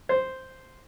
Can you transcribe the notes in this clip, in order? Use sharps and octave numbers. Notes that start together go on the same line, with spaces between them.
C5